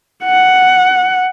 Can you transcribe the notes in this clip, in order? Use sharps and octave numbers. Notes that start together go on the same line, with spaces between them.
F#5